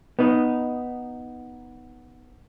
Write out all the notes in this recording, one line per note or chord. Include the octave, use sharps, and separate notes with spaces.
B3 D#4